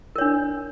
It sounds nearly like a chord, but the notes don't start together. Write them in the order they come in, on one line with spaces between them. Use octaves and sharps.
A#4 C#5 D4